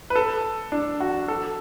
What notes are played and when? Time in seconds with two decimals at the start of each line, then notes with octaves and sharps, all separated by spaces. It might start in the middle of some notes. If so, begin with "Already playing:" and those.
0.10 B4
0.15 A4
0.72 D4
1.00 F#4
1.28 A4